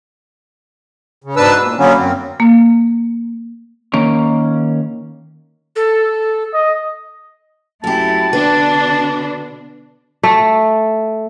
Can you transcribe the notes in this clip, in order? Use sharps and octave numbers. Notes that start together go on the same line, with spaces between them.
C#3
G#2 B2 D4 B4 A5 E6
A#2
D3 F#3 A#3 B3 C#4
F#2 C4
A#3
D#3 A#3 C#4
A4
D#5
F#2 A3 E4 G4 A5
B2 D3 D4 B4
A3